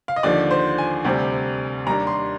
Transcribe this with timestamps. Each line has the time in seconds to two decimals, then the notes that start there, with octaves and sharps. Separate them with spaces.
0.08 F5
0.16 D#5
0.23 D#2 D3 F3 D5
0.51 C5
0.78 G#5
1.05 D2 C3 G3 C4
1.86 D#2 D#3 G3 D4 A#5
2.07 C6